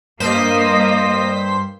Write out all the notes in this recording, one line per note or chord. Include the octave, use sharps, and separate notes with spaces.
G2 A#3 C5 D#5 B6